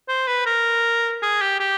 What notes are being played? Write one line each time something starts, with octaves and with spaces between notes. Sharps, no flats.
C5
B4
A#4
G#4
G4
G4